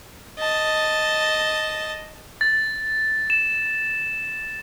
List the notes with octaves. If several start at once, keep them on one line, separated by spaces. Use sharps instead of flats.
D#5 A5
A6
E7